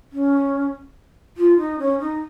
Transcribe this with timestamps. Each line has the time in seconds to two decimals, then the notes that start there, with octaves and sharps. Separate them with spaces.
0.12 C#4
1.37 F4
1.58 D#4
1.79 C#4
2.00 D#4